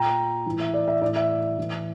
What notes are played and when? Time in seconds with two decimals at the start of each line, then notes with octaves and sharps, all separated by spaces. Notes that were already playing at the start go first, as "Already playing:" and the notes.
Already playing: A#2 G5 A#5
0.46 A2 E3
0.60 E5
0.74 D5
0.88 E5
1.01 A2 D5
1.05 E3
1.16 E5
1.58 A2 E3